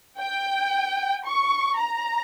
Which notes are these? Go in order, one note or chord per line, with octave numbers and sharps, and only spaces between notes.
G5
C#6
A#5